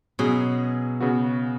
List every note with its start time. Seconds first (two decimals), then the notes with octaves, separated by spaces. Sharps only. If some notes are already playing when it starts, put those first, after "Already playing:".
0.19 B2 F#3 C#4 G#4
1.01 C#3 B3 F#4